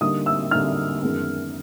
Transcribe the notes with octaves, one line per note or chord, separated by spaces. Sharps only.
D3 G3 A#3 D#4 D#6
E6
D3 G3 A#3 D#4 F6
F#2 D#3 G#3 B3